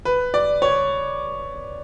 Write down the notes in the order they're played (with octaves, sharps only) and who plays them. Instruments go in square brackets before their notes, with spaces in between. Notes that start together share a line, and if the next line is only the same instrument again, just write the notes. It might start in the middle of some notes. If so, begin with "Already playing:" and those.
[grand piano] B4
D5
C#5